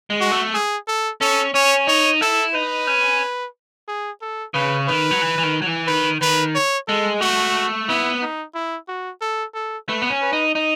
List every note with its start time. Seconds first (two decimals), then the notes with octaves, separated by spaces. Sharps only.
0.10 G#3
0.21 F#4
0.31 A3
0.54 G#4
0.88 A4
1.21 C#4 A4
1.54 C#4 C#5
1.87 D#4 C#5
2.21 E4 A4
2.54 D#4 B4
2.87 C#4
3.88 G#4
4.22 A4
4.54 C#3 B4
4.88 D#3 B4
5.11 F#3
5.21 E3
5.38 E3
5.43 D#3
5.62 F#3
5.66 E3
5.87 D#3 B4
6.21 D#3 B4
6.55 C#5
6.88 G#3 A4
7.21 A3 F#4
7.89 B3 E4
8.22 D#4
8.54 E4
8.88 F#4
9.21 A4
9.54 A4
9.89 A3 B4
10.02 B3
10.10 C#4
10.22 B4
10.33 D#4
10.55 D#4